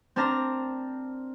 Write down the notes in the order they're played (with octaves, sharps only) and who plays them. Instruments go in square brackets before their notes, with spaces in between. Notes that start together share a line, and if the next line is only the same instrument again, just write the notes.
[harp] C4 D4 A#4 A5 A#5